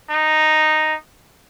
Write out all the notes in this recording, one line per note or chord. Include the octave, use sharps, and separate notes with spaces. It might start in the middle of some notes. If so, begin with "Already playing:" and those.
D#4